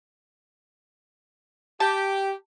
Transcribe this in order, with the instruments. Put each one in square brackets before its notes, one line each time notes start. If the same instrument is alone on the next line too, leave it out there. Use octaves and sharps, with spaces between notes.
[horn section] G4 [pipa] A5